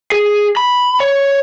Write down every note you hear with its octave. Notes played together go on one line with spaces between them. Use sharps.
G#4
B5
C#5